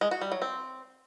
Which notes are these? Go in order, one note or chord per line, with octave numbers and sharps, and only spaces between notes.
G#3
F#4
G3
F#3
C4